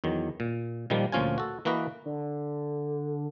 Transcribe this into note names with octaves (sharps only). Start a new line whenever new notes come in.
E2 D#3 F#3
A#2
A#2 D#3 F3 G3 A#3
D2 A#2 F3 C#4 F4 G#5
F#4 A4
E3 A#3 F#4 B4 D#5
D3